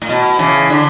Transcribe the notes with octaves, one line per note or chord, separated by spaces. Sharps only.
A2
B2
C#3 E3
D3